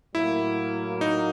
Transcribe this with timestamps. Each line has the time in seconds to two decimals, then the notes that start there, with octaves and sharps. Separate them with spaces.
0.15 A2 F#3 A#3 E4
1.01 D#4